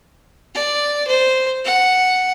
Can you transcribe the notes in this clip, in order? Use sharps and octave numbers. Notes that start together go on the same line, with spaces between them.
D5
C5
F#5